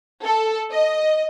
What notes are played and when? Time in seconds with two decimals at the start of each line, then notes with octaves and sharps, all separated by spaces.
0.24 A4
0.72 D#5